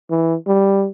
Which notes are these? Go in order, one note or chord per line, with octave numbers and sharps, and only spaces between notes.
E3
G3